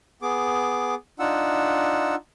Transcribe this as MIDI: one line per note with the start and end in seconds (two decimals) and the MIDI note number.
0.22 0.95 59
0.22 0.95 68
0.22 0.95 86
1.19 2.15 62
1.19 2.15 63
1.19 2.15 65
1.19 2.15 78
1.19 2.15 88